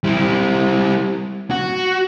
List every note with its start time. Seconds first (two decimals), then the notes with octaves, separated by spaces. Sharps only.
0.04 G3 E4
1.51 F#4